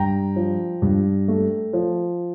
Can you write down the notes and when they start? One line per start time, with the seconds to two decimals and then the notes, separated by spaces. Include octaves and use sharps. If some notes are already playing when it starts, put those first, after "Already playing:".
Already playing: G2 G5 A#5
0.36 F3
0.82 G2
1.28 A3
1.73 F3